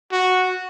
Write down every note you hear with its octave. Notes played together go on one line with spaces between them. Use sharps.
F#4